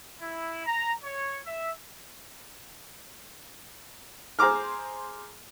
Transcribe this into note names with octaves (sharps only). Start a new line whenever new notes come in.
E4
A#5
C#5
E5
G#4 C5 A#5 D6 F6